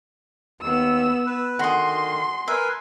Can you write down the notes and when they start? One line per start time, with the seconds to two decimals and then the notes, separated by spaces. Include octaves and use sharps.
0.61 D#2 B3 E6
1.26 B4
1.59 D3 D#3 F#4 G#4 C6
2.48 A#4 B4 E5 G#5